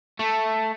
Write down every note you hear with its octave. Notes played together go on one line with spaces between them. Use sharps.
A3